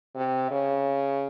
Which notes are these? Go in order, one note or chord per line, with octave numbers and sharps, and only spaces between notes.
C3
C#3